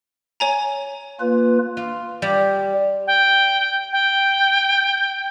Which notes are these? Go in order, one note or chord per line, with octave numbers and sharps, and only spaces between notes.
C#5 G#5 A#5
A#3 F4 B4
F4
G3
G5
G5